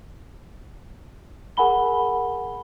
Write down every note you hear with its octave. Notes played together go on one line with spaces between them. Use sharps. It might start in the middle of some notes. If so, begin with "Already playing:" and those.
G#4 A#4 F#5 G#5 B5 G7